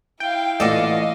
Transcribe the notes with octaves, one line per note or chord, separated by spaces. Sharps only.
E4 F5 G5
A1 A#2 A4 D5 D#5 F#5